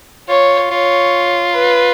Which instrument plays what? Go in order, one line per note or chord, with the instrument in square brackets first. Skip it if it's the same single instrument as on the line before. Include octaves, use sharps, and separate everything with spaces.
[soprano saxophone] F4 [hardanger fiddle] C#5
[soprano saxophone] F4 [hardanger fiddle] C#5
[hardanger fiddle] B4